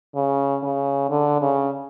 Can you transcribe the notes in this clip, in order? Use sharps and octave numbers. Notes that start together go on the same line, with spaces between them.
C#3
C#3
D3
C#3